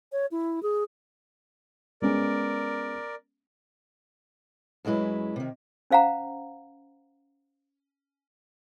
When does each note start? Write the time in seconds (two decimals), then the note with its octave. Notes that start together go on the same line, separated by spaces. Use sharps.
0.12 C#5
0.31 E4
0.63 G#4
2.02 G#3 B3 C#4 A#4 D5
4.85 F#2 F#3 G#3 E4 B4
5.36 C3 D#3
5.91 C#4 C5 F5 F#5 A#5